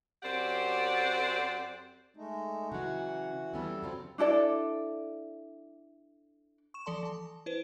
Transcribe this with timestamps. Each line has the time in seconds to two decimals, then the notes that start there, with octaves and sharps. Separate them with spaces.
0.23 F#2 C4 G4 C5 D5 F#5
2.17 G#3 A3 D#4
2.72 C#3 E3 F#3 F#4 F#5
3.53 E3 G3 B3 C#4 E4 A4
3.82 C#3 F#3 C4 F4
4.18 D4 E4 A4 D5
6.74 C#6 E7
6.86 E3 F3 A4 D5 A5 C6
7.03 E3 A5
7.46 E4 B4 C5